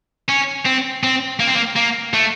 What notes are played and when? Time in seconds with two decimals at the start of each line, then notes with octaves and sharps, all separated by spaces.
0.29 C#4
0.66 C4
1.03 C4
1.40 A#3
1.47 C4
1.55 A#3
1.76 A#3
2.14 A3